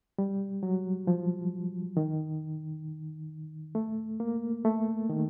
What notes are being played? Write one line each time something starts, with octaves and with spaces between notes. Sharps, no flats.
G3
F#3
F3
D#3
A3
A#3
A3
D#3